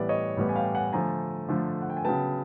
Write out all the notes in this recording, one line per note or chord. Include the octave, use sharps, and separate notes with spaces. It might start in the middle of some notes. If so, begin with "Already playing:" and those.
Already playing: A2 E3 G3 B3 D5 E5
C#5 D#5
A2 E3 G3 B3
G#5
F5 G5
F#5 G#5
D3 F3 A3 G#5 A#5
D3 F3 A3
F#5
G5
G#5
C#3 F#3 B3 G5 A5